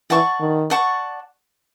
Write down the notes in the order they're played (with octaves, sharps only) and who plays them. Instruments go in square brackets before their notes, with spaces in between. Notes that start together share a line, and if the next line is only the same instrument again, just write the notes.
[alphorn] E3 [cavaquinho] D5 F#5 A5 C#6
[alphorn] D#3
[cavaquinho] D5 F#5 A5 C#6